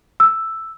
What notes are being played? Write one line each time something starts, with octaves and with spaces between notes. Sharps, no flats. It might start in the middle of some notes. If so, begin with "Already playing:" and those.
E6